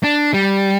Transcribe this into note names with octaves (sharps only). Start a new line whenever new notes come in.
D4
G3